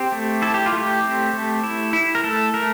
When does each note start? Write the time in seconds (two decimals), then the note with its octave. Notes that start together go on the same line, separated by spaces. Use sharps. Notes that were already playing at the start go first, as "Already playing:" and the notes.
Already playing: C4 G4
0.12 A3
0.42 E4 A4
0.54 G4
0.66 F4
0.72 A3
0.78 G4
1.03 C4
1.33 A3
1.63 E4
1.93 E4
2.15 A#4
2.24 A3 A4
2.54 A3 A#4